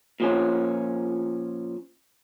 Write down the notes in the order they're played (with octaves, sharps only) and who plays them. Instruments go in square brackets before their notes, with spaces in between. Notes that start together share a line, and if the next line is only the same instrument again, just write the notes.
[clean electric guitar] A#2 F3 C#4